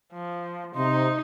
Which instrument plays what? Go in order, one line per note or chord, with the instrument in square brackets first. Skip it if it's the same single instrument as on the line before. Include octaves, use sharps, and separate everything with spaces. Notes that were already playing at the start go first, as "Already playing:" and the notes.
[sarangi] F3
[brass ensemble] C3 [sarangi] D#4 [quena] C6